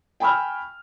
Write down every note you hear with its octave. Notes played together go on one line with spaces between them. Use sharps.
G5 G#5 B5 C#6 E6 F6